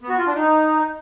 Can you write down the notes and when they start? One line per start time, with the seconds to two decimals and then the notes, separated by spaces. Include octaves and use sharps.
0.01 B3
0.09 F#4
0.18 F4
0.27 D4
0.36 D#4